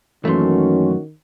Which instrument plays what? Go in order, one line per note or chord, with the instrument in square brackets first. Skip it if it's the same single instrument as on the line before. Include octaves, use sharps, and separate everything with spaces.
[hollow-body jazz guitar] F#2 A3 [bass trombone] D#3 [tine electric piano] E3 A#3 C6 [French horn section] C#4 F#4